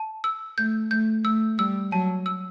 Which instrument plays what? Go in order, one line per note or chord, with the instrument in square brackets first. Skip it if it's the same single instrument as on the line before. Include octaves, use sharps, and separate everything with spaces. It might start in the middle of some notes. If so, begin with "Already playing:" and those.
Already playing: [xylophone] A5
E6
[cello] A3 [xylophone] G6
[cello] A3 [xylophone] G6
[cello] A3 [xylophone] E6
[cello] G3 [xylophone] E6
[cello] F#3 [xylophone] A5
[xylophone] E6